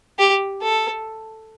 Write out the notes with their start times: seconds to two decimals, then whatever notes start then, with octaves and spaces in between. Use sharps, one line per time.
0.19 G4
0.62 A4